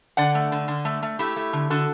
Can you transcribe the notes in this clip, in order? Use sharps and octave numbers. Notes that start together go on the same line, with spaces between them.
D3 D5 F#5
A3
D3
D3
A3
A3
A3 E4 G4
A3
D3
D3 F#4 A4